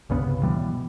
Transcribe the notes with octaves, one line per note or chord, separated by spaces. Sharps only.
C2 G2 C#3 B3
B2 E3 G3 B3